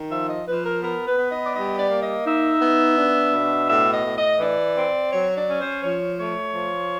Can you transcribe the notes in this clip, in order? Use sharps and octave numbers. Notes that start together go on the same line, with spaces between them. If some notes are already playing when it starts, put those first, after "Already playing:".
Already playing: D#3
F3 E5
D#5
F3 B4
A#4
B3 A#4
B4
B3
D#5
D5
G3 D#5
D5
A#3
D#5
D#4 E5
B3
D4
B2
A2 E5
D#5
A2
D#5
E3 D5
C4
F#3 C#5
D5
C#4
C5
F3 C#5
A3 C#5
F3